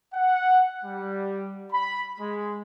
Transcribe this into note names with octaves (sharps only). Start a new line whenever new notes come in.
F#5
G3
B5
G#3